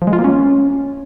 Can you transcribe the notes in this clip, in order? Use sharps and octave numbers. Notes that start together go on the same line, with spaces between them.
F3
G#3
F4
A#3
C#4